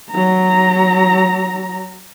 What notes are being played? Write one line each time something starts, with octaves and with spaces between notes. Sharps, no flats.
F#3 A#5